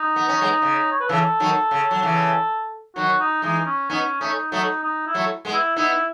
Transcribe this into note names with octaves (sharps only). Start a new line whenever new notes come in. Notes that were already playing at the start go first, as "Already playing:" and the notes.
Already playing: D#4
B3
C#4
G#3 B3
C#3
C#5
B4
C#3 E3 A4
D#3 F#3
C#3
F#3
C#3 E3
D#3 F#3 F#4
D#4
E3 G#3 D#4
C#4
B3 C#4 D#4
A3 C#4 D#4
F#3 A3 D#4
D#4
E4
F#3 A3
G#3 B3
E4
B3 D#4 E4